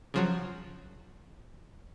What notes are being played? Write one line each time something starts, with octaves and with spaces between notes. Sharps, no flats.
C#3 F3 F#3